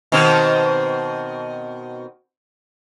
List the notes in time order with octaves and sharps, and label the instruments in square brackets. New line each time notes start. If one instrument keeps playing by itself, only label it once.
[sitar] B2 D#3 C4